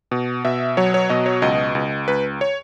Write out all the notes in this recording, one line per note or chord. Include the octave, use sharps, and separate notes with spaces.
B2
B2 E5
F#3 C#5
C#5
B2 D#5
C#5
C#2 D#5
C#2
C#2 B4
C#5